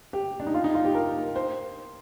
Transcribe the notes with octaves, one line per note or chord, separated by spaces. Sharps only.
G4
D4
D#4
F4
D#4
F4
G4
A#4
C5